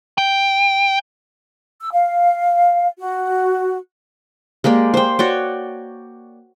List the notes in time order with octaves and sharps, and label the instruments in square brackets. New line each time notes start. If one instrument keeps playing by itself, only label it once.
[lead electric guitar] G5
[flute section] E6
F5
F#4
[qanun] G#3 A#3 G4 D5
C5 G5
F#4 C#5 D5 G5